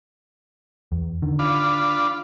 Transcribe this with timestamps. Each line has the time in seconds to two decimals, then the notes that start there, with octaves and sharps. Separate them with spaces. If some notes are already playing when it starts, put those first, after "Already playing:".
0.92 E2
1.22 D3 D#3
1.39 D4 F4 B5